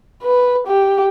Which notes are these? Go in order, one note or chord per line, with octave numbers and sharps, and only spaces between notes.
B4
G4